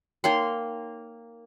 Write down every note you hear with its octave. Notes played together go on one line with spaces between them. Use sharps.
A#3 D#4 C#5 G5 C6